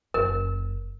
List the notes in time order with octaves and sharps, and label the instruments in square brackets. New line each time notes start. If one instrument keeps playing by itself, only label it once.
[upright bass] F#1 [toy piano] A#4